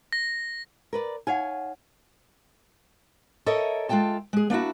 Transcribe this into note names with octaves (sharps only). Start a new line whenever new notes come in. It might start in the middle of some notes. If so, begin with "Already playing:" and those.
A#6
A#4 B4 D5
D#4 C#5 F5 F#5 G#5
A4 A#4 C#5 D#5 E5
G#3 F4 A4 G5 A5
G#3 G#4
A#3 D4 E4 F#4